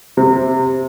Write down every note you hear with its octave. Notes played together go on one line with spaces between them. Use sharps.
C3